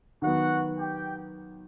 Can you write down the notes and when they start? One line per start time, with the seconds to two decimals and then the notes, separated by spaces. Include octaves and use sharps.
0.22 D#3 F#3 B3 F#4 F#5
0.77 G4 G5